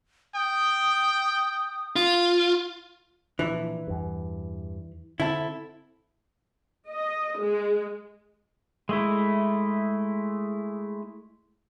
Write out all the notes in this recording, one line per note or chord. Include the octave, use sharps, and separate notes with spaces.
G5 D#6
F4
A#2 E3 F3 D4
E2 G2
D3 C4 E4 A4
D#5
G#3
G#3 A3 E4